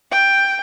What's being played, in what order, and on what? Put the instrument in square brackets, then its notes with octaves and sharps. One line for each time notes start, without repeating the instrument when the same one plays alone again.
[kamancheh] G5